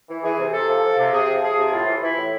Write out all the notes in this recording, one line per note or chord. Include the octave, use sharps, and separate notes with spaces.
E3
E3 G#4
C3
C3 A4
F3
F3
C3
C3 G#4
F3
F3 G#4
C3
A2 F4
E3
E3 E4
A2